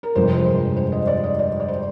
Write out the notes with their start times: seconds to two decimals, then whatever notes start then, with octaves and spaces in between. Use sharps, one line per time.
0.03 A#4
0.15 G1 F2 C3 F3 G#3 C5
0.76 C5
0.92 D#5
1.07 D5
1.23 D#5
1.39 D5
1.60 D5
1.68 C5